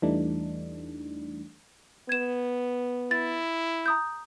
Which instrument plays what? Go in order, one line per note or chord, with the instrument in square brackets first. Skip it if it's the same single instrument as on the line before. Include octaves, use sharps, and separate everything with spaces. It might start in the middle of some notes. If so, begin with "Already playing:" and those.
[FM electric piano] E2 E3 G3 A3 D4 D#4
[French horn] B3 [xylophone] G#6 E7
[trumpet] E4 [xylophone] A6
[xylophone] A#5 D#6 G6